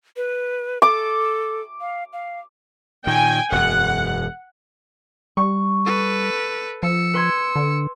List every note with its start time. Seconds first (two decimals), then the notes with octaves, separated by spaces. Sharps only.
0.17 B4
0.82 A4 D6
1.81 F5
2.13 F5
3.07 A#2 D#3 G5 G#5
3.52 E1 F#2 F#5
5.37 G3 C#6
5.86 A4 B4
6.83 F3 E6 C#7
7.14 B4 C6 G#6
7.56 D3